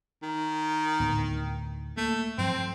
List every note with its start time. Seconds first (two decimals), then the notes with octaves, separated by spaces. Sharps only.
0.23 D#3
1.00 D2 A2 B3
1.97 A3 A#3
2.38 G2 F3 F#3 C4